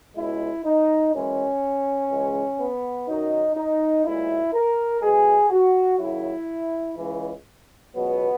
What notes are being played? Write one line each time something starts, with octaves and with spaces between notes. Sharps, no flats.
C#2 B2 G#3 E4
D#4
F#2 E3 G#3 C#4
C#2 C#3 E3 G#3
B3
F#2 D#3 F#3 D#4
D#4
B1 A#2 G#3 E4
A#4
B1 B2 G#3 G#4
F#4
D#2 C#3 F#3 E4
C#2 C#3 E3 G#3
C#2 B2 F#3 B3